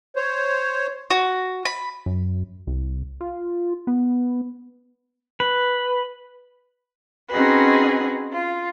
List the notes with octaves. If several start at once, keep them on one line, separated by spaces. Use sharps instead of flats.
C5 C#5
F#4
B5
F#2
C2
F4
B3
B4
C4 C#4 D#4 F#4 G#4 B4
F4